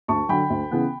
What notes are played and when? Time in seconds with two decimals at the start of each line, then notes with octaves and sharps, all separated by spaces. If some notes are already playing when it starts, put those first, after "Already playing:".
0.08 D2 A5 C#6
0.29 D3 F#3 G5 B5
0.50 D2
0.71 C#3 E3 B3